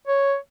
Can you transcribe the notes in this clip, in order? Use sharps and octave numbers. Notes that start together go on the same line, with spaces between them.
C#5